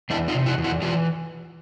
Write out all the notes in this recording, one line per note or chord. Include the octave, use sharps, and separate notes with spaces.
E2 D4 E4
D#4 F4
C3
E4 F#4
E2
E4 F#4
E3 F4 G4